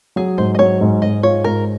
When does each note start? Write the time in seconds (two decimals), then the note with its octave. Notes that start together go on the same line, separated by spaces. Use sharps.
0.16 F#3 G#4
0.38 G#2 C5
0.55 D#5
0.59 F#3 C#5
0.81 G#2
1.02 G#2 D#5
1.23 F4 C#5
1.44 G#2 A#4